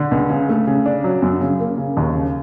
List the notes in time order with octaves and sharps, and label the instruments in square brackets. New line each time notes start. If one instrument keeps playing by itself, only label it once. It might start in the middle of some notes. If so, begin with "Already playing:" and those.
Already playing: [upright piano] D3
C#2
C#3
A3
C#3
D4
F#3
F#2
C#3
A#3
C#3
D#2
C#3